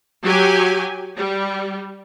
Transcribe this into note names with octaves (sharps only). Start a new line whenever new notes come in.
F#3 G4 G#5
G3